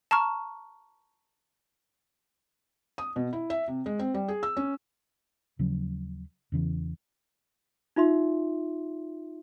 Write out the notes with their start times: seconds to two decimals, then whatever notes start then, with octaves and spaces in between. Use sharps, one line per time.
0.11 A5 A#5 C#6 F6
2.98 D#6
3.16 B2
3.33 E4
3.50 E5
3.68 C3
3.86 G#3
3.99 C4
4.14 G3
4.28 G#4
4.43 E6
4.57 C#4
5.59 D#2 C#3 F3 F#3
6.52 E2 C#3 E3
7.96 D#4 F4 E5 C6